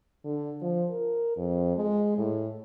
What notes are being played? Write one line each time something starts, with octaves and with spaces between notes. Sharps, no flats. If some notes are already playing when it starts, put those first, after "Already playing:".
D3
F3
A#4
F2
G#3
A2